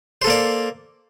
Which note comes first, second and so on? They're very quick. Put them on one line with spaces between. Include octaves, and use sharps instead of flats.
C5 A4 A#3 D5